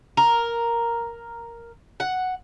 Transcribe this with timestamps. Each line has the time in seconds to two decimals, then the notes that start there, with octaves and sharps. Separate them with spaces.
0.17 A#4
2.00 F#5